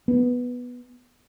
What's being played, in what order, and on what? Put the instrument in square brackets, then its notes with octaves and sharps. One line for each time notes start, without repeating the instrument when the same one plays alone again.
[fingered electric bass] B3